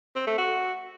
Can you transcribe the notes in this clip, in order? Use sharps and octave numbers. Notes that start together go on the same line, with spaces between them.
C4
A3
F#4